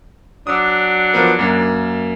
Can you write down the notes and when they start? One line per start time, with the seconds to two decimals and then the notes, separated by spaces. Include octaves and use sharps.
0.47 F#3 D4 D#6 E6
1.14 F3 B3 A#4
1.39 F#2 A#3